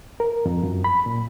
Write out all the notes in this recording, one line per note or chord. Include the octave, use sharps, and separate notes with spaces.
A#4
F2
F#2
B5
A#2